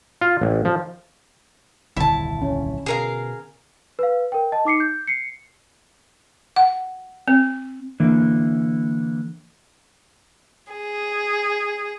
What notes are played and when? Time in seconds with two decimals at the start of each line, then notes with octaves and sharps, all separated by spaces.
0.21 F4
0.42 A1
0.65 F3
1.97 D#1 C2 F2 D3 E4 A5
2.42 C#4
2.86 B2 G#4 A#4 F5
3.99 B4 F5
4.32 A#4 G5
4.52 D#5 A5
4.65 D#4 D6 C7 C#7
4.80 G6
5.07 C7 C#7
6.56 F#5
7.28 C4
8.00 D3 E3 A#3
10.73 G#4